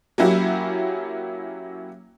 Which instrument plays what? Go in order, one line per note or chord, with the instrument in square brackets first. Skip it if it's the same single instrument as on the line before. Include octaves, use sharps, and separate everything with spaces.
[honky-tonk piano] F#3 A#3 C#4 E4 F#4 G4